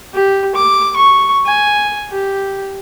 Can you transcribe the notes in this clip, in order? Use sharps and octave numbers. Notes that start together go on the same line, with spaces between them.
G4
D6
C#6
G#5
G4